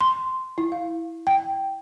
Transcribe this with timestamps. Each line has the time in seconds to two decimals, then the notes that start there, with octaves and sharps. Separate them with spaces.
0.01 C6
0.58 E4
0.72 F5
1.27 G5